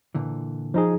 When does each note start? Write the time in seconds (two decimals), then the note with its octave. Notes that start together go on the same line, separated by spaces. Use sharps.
0.15 A#2 D3 E3
0.74 F3 D#4 G#4